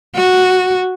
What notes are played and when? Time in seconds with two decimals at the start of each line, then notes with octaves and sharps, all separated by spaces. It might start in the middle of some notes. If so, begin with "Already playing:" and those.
0.16 F#4